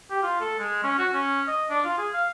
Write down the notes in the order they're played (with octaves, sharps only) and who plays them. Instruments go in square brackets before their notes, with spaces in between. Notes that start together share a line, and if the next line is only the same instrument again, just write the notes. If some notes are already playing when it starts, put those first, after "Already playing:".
[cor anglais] G4
F4
A4
G#3
C#4
F#4
C#4
D#5
D4
F4
G#4
F5